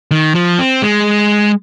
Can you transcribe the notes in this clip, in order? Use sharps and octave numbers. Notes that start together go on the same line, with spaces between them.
D#3
F3
C4
G#3